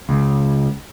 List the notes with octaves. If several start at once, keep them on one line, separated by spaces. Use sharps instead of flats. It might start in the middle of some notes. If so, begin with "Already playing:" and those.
C#2